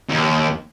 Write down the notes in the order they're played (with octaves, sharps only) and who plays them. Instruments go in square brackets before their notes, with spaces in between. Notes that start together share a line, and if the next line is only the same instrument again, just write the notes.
[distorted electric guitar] D#2